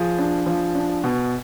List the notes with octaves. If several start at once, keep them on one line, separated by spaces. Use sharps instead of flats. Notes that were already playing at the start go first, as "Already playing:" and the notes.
Already playing: F3 G#4
D4
F3
D4
B2